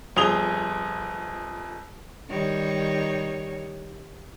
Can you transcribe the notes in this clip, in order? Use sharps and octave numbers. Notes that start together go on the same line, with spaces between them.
G1 F2 G#4 D#6 F7 G7
D#3 G3 C#5